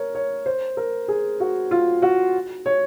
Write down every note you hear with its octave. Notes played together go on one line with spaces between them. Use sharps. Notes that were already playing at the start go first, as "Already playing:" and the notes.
Already playing: A#4 C#5
C#5
C5
A#4
G#4
F#4
F4
F#4
C#5